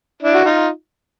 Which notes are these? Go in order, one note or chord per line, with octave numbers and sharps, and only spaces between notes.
D4 E4
F#4
D#4 F4